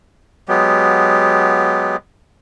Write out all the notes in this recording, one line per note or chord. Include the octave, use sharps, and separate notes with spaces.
F#3 G#3 B3 G4